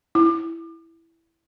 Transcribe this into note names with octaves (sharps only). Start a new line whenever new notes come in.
E4